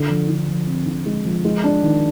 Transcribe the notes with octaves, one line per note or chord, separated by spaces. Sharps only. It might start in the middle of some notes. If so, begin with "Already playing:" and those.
Already playing: D3
F3
D3
F3
C4
D3
G#3
F3
G#3
D4
D#3